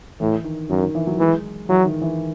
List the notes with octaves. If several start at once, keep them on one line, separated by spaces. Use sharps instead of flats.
A2 E3
D#3
F#2 D#3
D#3
E3
F#3
E3 G#3
E3 F#3
D#3
E3